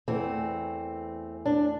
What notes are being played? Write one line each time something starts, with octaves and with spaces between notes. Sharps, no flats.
E2 E3 A3 C4
D4